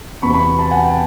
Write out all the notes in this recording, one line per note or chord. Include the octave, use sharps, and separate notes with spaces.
E2 C3 E3 B5 C#6
B5 C#6
A5 B5
F#5 G#5
G5 A5